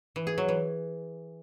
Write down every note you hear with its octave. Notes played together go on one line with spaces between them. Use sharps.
E3
G#4
F#3
E3